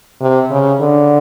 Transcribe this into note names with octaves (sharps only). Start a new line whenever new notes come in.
C3
C#3
D3